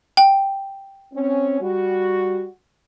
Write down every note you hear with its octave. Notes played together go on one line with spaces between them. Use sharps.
G5
C4 C#4
G3 F#4